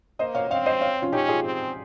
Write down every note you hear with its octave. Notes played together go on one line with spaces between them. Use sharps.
A#3 C5 D#5
C#5 F5
C4 C#5 F5
C5 D#5
C#5 F5
C#4 F4
C#4 D#4 G4
F4 G#4
C4